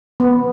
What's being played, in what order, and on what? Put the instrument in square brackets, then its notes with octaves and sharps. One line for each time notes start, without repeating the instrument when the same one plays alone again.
[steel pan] B3